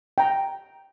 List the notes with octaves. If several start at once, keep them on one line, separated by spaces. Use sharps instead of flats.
G5 A#5